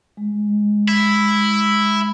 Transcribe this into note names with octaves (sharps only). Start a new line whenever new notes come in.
G#3
E4